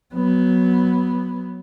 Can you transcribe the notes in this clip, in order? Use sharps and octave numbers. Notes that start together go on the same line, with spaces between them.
F#3 B3